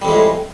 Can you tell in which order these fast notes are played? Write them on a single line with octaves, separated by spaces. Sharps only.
G3 F2 G#3 A2